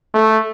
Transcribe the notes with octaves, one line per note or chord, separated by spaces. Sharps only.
A3